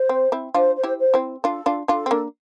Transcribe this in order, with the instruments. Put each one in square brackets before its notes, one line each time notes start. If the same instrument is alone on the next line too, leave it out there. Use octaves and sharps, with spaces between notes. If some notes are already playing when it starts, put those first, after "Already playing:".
Already playing: [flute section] C5
[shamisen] C4
C4 E4
[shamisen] D4 F4 [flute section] C5
[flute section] C5
[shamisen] E4 G4
[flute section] C5
[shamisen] C4 E4
[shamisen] D4 F4 [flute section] A4
[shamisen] D4 F4
[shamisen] D4 F4 [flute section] A4
[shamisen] C4
A#3 D4